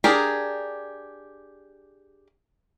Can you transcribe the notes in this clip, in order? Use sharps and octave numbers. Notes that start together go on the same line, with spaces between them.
D4 G4 G#4 A#4